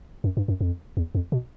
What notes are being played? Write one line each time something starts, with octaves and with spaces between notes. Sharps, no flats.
F#2
G2
F#2
F2
E2
F2
B2